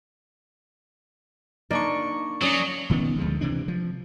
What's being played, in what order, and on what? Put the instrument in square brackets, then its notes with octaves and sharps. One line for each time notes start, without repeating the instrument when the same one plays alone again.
[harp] A#3 D4 C#6 [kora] D#4 D5
[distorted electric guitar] F#3 [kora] C#4 D5 [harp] D#6 C#7
[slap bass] E1 D#3 B3 C#4
D2 F3 G#3
C3 E3 D4
F3